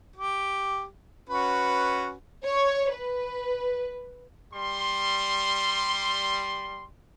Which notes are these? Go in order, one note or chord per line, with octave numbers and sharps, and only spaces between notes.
G4
C#4 F#4 B4
C#5
B4
G3 C6